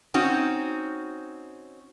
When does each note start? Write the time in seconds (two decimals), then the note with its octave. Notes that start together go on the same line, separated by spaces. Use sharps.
0.14 C4 C#4 D#4 F#4